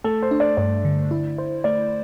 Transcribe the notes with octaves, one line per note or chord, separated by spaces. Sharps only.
A3 A4
C5
D4
D5
G2 D5
D3
E4
C5
A3 D5